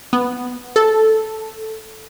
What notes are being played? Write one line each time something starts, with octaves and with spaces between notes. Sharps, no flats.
B3
A4